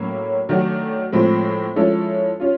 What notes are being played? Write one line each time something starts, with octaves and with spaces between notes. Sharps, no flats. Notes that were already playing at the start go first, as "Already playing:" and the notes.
Already playing: A2 F#3 A#3 C#4
D#3 F#3 A3 D4 F#4
A2 F3 G#3 C4
F3 G#3 C#4 E4 A4
C#4 F4